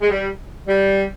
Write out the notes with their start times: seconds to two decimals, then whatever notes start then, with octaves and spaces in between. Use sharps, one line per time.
0.01 G#3
0.09 G3
0.67 G3